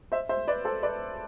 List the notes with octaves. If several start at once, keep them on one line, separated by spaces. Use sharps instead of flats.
C5 E5
C5 E5
B4 D5
A4 C5
B4 D5